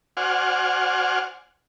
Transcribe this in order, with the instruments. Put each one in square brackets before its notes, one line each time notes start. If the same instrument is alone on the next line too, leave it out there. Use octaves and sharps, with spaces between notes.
[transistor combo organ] F#4 C5 D5 F#5 G#5 F6